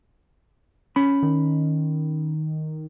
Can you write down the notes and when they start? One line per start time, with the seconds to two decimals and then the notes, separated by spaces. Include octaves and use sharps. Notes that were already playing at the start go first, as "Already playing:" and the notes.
0.96 C#4 B5
1.23 D#3